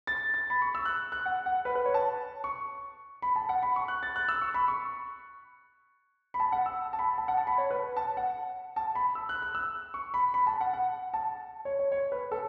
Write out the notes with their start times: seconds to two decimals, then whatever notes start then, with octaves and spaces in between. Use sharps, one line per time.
0.07 A6
0.34 A6
0.50 B5
0.62 C#6
0.75 E6
0.85 F#6
1.12 F#6
1.25 F#5
1.46 F#5
1.65 B4
1.75 B4
1.85 C#5
1.94 A5
2.44 C#6
3.22 B5
3.36 A5
3.49 F#5
3.63 B5
3.76 C#6
3.88 F#6
4.03 A6
4.16 F#6
4.29 E6
4.41 C#6
4.54 B5
4.68 C#6
6.34 B5
6.40 A5
6.52 F#5
6.66 E6
6.93 A5
6.99 B5
7.18 A5
7.28 F#5
7.37 A5
7.47 B5
7.58 C#5
7.71 B4
7.96 A5
8.17 F#5
8.76 A5
8.95 B5
9.15 E6
9.29 F#6
9.42 F#6
9.55 E6
9.94 C#6
10.14 B5
10.34 B5
10.47 A5
10.61 F#5
10.73 F#5
11.14 A5
11.65 C#5
11.79 C#5
11.92 C#5
12.12 B4
12.32 A4